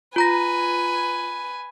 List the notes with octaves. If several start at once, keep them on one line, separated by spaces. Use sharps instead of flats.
F4 B4 G#5 A#5 A#6